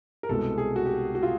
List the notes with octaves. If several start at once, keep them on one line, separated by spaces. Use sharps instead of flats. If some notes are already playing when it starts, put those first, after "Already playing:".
A#4
C2 B2 G#3 A4
G#4
F#4
G4
F#4
F4